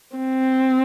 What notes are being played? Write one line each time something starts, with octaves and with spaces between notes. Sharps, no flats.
C4